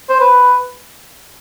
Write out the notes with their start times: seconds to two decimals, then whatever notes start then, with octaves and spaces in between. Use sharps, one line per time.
0.09 C5
0.21 B4